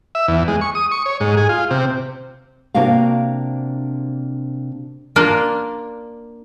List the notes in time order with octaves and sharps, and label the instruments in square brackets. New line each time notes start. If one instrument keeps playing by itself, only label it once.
[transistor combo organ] E5
E2
G#3
C#6
D#6
C#6
C#5
G#2
G#4
F4
C3
[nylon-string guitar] C3 A#3 D4 F#4 F5
[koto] A#3 D4 F4